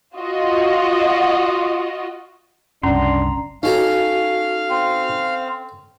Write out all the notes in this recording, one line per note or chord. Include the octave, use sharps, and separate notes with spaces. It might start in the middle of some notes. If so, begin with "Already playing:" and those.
F4 F#4 D#5
F#1 C2 C#4 D4 A#5 C6
C#4 D#4 F#4 A4 F5 A#5
C4